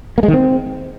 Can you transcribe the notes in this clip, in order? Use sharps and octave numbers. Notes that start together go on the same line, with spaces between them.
A#3
G#3
D#3
C4